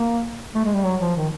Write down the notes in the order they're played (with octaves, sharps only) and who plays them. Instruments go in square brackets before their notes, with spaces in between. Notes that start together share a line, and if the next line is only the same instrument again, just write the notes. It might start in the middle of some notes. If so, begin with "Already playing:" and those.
Already playing: [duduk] A#3
A3
G#3
G3
F#3
F3
D#3